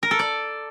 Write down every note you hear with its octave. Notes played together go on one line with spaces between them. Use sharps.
A#4
A4
D5